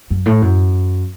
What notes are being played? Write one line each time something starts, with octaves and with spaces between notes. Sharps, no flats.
F#2
A2
F#2